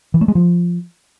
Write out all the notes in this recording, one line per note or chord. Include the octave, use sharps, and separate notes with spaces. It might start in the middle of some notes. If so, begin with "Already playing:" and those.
E3
A3
G#3
F3